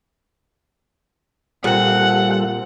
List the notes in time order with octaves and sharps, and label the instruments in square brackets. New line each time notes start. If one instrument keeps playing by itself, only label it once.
[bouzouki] A#2 C4 [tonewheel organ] G3 F4 A4 [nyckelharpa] F#5